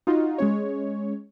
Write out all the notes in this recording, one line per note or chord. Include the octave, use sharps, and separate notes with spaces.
D#4 F4 F#4
G#3 C#4 C#5